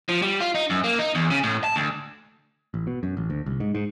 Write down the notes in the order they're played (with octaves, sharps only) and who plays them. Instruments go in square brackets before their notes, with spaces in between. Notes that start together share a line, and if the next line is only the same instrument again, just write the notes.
[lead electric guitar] F3
G3
F4
D#4
F#2
A#3
D#4
E2
C#3
A2
A5
D2
[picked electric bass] A1
B2
F#2
A1
D2
C2
G#2
G#2